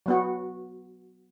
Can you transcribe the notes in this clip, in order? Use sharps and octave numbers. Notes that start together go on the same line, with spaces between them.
F#3 B3 F#4